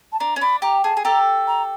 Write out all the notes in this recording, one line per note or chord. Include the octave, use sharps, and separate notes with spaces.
A5
D4 A#5
C#4
D4 B5
G4 A#5
G#4 A5
G#4
G4 A4 A#5
A#5